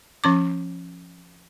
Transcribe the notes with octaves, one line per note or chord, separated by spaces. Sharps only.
F3 C#4 D6